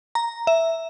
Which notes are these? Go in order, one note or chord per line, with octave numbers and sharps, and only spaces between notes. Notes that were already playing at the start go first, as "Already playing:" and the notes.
A#5
E5